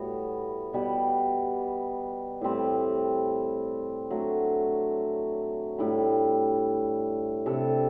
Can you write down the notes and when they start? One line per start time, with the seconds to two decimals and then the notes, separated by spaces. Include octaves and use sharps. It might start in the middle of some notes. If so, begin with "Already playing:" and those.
Already playing: A2 G3 B3 F#4
0.73 B2 G3 B3
2.41 A2 G3 C4
4.10 F#3 A3 D4
5.78 A2 G3 D4
7.46 C3 G3 D4 A4